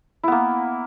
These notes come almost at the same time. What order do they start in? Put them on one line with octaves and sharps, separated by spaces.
E4 B3 A#3